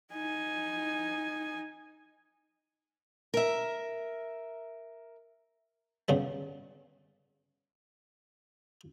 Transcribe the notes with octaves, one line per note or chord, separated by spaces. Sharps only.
D#4 G#5
A#4 E5
G2 C#3 G3 B3